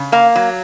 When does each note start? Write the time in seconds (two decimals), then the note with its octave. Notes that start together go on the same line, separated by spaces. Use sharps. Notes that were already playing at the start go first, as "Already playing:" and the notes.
Already playing: C#3
0.12 A#3 F5
0.36 F#3